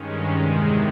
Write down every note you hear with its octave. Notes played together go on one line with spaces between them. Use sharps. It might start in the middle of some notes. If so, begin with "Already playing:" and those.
Already playing: G2 D#3 G#3 C#4
E2 C3 D#3 G#3